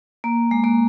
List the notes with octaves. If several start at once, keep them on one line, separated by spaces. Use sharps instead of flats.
A#3
G#3
A#3